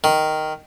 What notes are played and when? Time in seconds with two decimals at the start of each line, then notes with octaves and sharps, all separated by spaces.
0.04 D#3